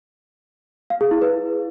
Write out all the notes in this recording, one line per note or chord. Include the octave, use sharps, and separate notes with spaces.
F5
G#4
E4
B4